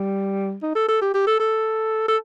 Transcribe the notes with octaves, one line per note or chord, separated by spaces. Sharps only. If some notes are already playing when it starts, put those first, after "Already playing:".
Already playing: G3
D#4
A4
A4
G4
G4
A4
A4
A4